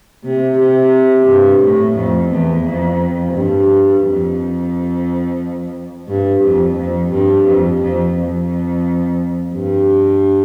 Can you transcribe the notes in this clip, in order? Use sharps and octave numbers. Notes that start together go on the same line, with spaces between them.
C3
C3
G2
A2
F2
E2
F2
G2
F2
G2
F2
F2
G2
F2
F2
F2
G2